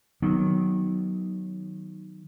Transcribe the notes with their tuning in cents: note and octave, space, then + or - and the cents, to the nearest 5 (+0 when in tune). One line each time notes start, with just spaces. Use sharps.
D#3 +0 F#3 +0 B3 +0